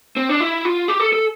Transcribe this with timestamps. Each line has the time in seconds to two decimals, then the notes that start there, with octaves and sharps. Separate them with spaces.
0.17 C4
0.29 D4
0.40 E4
0.65 F4
0.88 G4
1.00 A4
1.13 A4